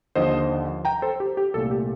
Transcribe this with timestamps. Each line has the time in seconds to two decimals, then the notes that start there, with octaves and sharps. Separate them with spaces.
0.15 D#2 D3 F3 C5 D#5
0.85 G5 A#5
1.02 A4 C5
1.20 G4
1.37 G4
1.54 C2 A#2 A3 A4
1.71 G4